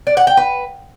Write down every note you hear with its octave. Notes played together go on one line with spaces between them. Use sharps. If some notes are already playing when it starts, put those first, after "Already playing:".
D5
F#5
G5
B4